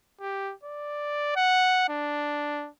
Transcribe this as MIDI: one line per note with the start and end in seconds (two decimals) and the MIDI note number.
0.21 0.53 67
0.63 1.31 74
1.36 1.85 78
1.89 2.68 62